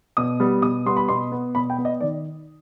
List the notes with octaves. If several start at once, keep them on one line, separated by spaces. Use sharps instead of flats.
B2 D#6
G3 B3
B2 D#6
G3 B3 C6
B5
B2 C6
B3
B2 B5
G5
B3
D#5
D#3 D5